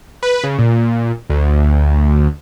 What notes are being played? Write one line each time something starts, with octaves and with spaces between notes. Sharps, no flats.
B4
C#3
A#2
D2